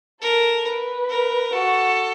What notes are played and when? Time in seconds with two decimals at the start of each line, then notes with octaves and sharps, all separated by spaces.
0.21 A4 A#4
0.66 B4
1.10 A#4
1.53 F#4 A4